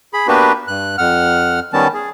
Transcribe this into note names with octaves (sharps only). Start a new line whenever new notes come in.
G#4 B5
A#3 B3 D4 F#4 G4 B4
G2 F#6
F2 F#5 F6
D#3 G3 B3 C#4 A5
G#4